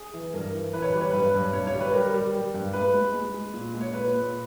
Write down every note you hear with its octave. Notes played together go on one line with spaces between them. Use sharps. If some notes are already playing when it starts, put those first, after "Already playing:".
Already playing: G#4
E3
G2 A#4
E3
E3 B4
C#5
G3 B4
C#5
G2 B4
G2
G2 C#5
C#5
G3
B4
G3 A#4
G3
G3
G2
G#3 B4
G#3
G#3
G#3
A#2
G#3
C#5
A#2 B4
A#2